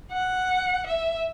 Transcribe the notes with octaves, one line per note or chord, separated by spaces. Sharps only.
F#5
E5